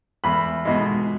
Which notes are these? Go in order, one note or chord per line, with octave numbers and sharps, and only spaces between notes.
E2 B5
B2 G#3